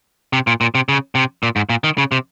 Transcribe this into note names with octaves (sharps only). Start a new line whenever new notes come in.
C3
A#2
A#2
C3
C#3
C3
A#2
G#2
A#2
D#3
C#3
C3